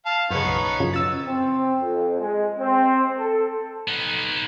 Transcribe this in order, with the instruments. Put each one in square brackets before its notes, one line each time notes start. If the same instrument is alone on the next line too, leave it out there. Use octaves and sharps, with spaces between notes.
[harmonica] F5 A5
[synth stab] F#2 C#3 [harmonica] B3 D#4 C#5
[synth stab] B1
F#2 C#3 F3
E6 A6
[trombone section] C4
F2
G#3
C4
A4
[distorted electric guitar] B3 D#4